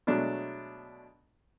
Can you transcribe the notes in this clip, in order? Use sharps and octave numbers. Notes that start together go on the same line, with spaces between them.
B2 F#3 G#3 A3 D4